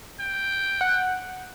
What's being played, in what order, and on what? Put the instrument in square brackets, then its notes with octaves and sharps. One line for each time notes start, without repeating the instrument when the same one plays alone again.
[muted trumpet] G5
[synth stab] F#5